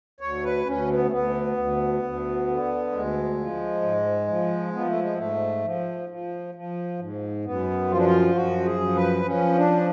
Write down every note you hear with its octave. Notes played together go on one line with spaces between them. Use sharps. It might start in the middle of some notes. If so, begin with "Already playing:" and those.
D2 C#5
B4
D2 C#4
B3
A3
D2 B3
D2
D2
D3
D2 G#3
F3
G#2
F3
F3 B3
A3
G#3
G#2 A3
F3
F3
F3
G#2
F#2 B3
F3 F4
D4
F4
F#2 F#4
G#4
F3
B4
F3 C#4
D4